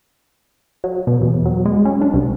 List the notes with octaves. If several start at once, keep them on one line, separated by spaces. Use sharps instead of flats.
F#3
B2
E2
F#3
G#3
C#4
D4
C2